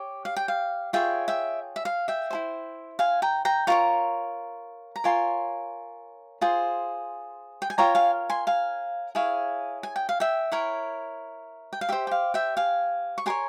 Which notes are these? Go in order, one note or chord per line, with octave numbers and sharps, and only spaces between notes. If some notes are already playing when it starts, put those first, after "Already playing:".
Already playing: G4 C#5
F5
G5
F5
F4 G#4 C#5 E5 G5
E5 G5
E5
F5
E5 G5
E4 G#4 C5
F5 G#5
G5 A#5
G5 A#5
F4 A#4 C#5 A#5 C#6
A#5
F4 A#4 C#5 G#5 C6
F4 G#4 C5
G5
G#5
F4 A#4 C#5 G5 A#5
F5 G#5
G#5 C6
F5 G#5
E4 G#4 C#5 F5 G#5
G#5
G5
F5
E5 G5
E4 A#4 C#5
G5
F5
G4 C5 E5
G5
F5
E5 G5
F5 G#5
C#6
G4 A#4 C#5 G#5 C6